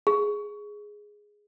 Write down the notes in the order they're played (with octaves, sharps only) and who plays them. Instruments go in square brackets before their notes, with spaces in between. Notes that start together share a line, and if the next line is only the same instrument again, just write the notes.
[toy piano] G#4